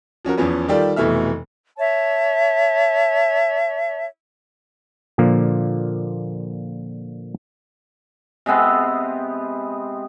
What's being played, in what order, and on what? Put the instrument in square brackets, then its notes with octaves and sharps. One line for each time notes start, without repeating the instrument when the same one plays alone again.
[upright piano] F3 C#4 F#4 A#4
E2 E3 F3 B3 C#4
D#3 G3 F4 G4 A4 D5
F1 B2 E3 A3 E5 F6
[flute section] C#5 E5 A5
[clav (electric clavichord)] A#2 D3 F3 A#3
[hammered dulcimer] C3 G#3 B3 C4